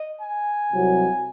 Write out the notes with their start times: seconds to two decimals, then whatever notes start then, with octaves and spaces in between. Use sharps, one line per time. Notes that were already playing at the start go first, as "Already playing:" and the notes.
Already playing: D#5
0.22 G#5
0.73 C2 C3 F#3